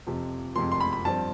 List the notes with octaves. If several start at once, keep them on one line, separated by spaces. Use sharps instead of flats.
F2 C3 F3
F2 C3 F3 C6
C6
B5
B5
G2 F3 C4 A5